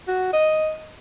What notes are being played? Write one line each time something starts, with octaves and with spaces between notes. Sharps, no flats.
F#4
D#5